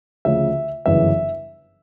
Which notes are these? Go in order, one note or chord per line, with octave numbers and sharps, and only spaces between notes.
D2 C#3 F3 E5
G1 F#2 C#3 E3 E5